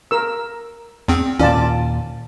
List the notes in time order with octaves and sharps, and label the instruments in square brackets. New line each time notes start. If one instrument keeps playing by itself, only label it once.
[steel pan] A#4 E6
[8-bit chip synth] E2 C4
[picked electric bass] D#2 A#2 [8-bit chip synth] C#4 [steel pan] F4 D5 A5